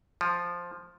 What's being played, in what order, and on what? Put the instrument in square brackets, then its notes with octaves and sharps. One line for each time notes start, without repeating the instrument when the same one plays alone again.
[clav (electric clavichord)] F3